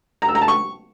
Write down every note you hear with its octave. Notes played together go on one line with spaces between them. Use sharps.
A#5
E6
A#5
A5
C#6